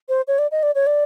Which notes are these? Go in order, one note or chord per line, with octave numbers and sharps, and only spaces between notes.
C5
C#5
D5
D#5
D5
C#5
D5